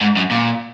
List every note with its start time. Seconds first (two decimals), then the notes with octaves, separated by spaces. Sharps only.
0.01 G#2
0.17 F#2
0.31 A#2